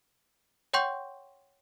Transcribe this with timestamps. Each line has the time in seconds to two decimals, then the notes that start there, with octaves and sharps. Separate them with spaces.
0.73 C#5 F#5 G5 C6 C#6 G6